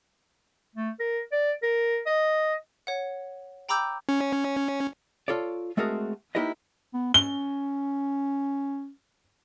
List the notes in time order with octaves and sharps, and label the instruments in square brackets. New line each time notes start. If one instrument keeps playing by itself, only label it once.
[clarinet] A3
A#4
D5
A#4
D#5
[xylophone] C#5 F#5
G5 A#5 B5 D6 E6 G6
[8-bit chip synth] C#4
[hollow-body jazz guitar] F4 A4 C#5 D5
G#3 A3 C4 F#4 G#4 A#4
A#3 D#4 E4 G4 B4 D#5
[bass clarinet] B3
[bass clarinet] C#4 [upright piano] G7